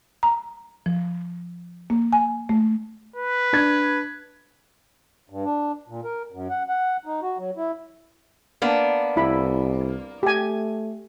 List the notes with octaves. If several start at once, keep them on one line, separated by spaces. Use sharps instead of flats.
A#5
F3
A#3
G#5
A3
B4
D4 G#6
G2
D4
A#2
A#4
F#2
F#5
F#5
D#4
F#4
F#3
E4
A#3 B3 D4
C2 E4 B5
A3 G4 G#5